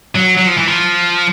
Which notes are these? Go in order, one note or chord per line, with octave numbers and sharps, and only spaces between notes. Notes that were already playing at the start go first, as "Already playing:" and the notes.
F#3
F#3
F3
E3
F3